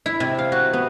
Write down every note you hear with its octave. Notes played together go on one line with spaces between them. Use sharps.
E4
C3
F5
F#4
B3